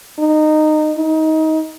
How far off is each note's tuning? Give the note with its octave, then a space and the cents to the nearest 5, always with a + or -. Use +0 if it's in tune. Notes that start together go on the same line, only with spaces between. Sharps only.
D#4 -20
D#4 +25